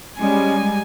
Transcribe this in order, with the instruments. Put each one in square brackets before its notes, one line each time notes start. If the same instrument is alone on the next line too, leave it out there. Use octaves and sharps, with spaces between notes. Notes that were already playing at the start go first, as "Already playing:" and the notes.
[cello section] G3 G#3 [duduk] C#4 [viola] G#5